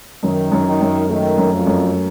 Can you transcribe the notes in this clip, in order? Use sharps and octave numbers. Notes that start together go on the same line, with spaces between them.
F#2 D#3
F#2
D#3
F#2
D#3 A3
F#2
F2
F#2